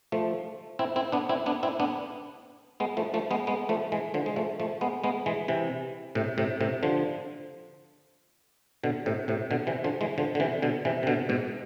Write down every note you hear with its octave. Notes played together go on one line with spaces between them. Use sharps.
F3 A3
C4 E4
C4 E4
B3 D4
C4 E4
B3 D4
C4 E4
B3 D4
G#3 B3
F3 A3
F3 A3
G#3 B3
G#3 B3
F3 A3
E3 G#3
D3 F3
G#3
F3 A3
F3 A3
G#3 B3
G#3 B3
E3 G#3
C3 E3
A2 C3
A2 C3
A2 C3
D3 F3
B2 D3
A2 C3
A2 C3
B2 D3
C3 E3
D3 F3
E3 G#3
D3 F3
D3
C3 E3
B2 D3
C3 E3
C3
B2 D3
G#2 B2